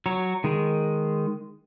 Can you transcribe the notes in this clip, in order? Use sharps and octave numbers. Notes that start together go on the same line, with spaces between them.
F#3 C#5
D#3 G#3